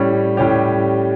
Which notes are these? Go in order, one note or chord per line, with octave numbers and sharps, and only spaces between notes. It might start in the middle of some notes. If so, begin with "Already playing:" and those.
Already playing: A2 G3 C#4
A2 G3 C#4 G4